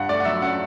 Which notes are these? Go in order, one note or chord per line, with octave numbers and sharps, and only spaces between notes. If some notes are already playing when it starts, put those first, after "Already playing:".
Already playing: G2 F#5
A3 D5
F#5
F#3 E5
C#4 F#5